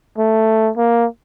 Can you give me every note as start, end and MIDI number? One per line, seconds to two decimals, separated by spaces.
0.18 0.72 57
0.77 1.07 58